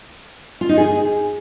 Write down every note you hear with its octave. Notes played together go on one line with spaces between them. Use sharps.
F4
D#4
G#4